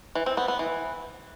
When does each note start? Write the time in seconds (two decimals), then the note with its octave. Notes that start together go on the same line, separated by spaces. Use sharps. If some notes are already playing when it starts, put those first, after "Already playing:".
0.15 E3
0.26 C4
0.37 B3
0.48 B3
0.59 E3